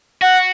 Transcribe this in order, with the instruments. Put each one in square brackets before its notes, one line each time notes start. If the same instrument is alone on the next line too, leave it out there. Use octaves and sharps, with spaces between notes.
[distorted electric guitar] F#4 [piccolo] F#5